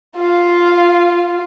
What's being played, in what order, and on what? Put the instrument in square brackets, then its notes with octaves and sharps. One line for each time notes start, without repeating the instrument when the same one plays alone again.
[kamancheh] F4 F5